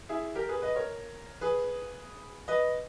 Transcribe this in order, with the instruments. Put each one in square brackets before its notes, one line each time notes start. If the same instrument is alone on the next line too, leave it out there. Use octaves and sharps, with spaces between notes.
[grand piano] E4 G#4
G4 A#4
G#4 B4
B4 D#5
A#4 C#5
G#4 B4
B4 D#5